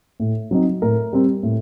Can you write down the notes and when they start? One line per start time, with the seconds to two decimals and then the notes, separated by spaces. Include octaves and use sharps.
0.20 A2
0.51 F#3 C4 D#4
0.82 A2 A#4
1.13 G3 C4
1.43 A2